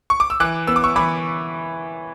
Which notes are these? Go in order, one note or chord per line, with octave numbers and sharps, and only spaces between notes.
C#6
D6
E6
E3 D6 F#6
B3 E6
D6
C#6 E6
E3 B5 D6